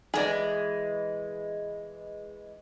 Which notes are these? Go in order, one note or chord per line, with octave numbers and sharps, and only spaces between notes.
E3 G#3 G#4 D5